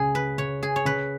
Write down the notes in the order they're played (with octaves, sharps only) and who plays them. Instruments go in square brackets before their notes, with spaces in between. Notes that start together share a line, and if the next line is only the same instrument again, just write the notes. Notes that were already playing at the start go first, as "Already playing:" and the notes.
Already playing: [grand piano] C#2 C#3 [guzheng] G#4
[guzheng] B4
[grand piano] C#3 [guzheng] C#5
[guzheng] G#4
C#5
[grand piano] C#3 [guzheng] B4